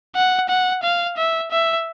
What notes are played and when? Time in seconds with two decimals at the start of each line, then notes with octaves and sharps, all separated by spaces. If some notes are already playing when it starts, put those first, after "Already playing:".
0.16 F#5
0.49 F#5
0.83 F5
1.17 E5
1.51 E5